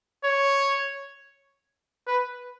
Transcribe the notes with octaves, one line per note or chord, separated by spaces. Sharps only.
C#5
B4